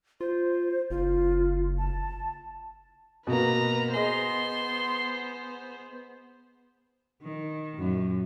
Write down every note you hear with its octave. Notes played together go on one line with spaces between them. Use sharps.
F4 C5
F#1 F4
A5
B2 A#3 B4 A#5
B3 G#4 C5 D#5 C6
D#3
F#2 A#2